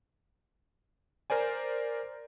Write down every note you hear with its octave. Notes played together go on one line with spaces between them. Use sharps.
A#4 C5 D5 G#5